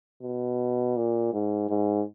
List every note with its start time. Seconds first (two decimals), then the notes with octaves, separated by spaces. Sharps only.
0.22 B2
0.96 A#2
1.33 G#2
1.69 G#2